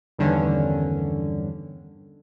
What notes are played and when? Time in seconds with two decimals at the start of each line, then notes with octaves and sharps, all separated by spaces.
0.19 E2 G2 D3 D#3 C#4